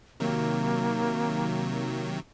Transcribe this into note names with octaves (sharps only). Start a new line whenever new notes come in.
C3 D#3 F#3 A#3